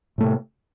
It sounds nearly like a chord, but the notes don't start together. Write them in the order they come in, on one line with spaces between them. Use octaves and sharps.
A2 A3 C3